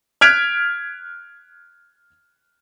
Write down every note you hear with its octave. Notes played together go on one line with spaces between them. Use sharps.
F6 F#6 G#6 B6 D7 F7